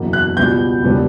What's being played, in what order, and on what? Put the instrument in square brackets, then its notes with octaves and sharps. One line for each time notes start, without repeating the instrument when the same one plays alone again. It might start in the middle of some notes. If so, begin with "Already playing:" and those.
Already playing: [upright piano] F#1 E2 B2 A#3
F#6
C#2 B2 G3 B3 G6
E1 C#3 G3 B3